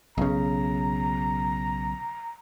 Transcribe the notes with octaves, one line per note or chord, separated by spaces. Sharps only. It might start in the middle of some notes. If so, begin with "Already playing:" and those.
B1 C#3 A#5